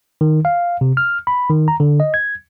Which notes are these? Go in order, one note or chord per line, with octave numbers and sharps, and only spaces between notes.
D#3
F5
C3
F6
B5
D#3
A#5
D3
D#5
G#6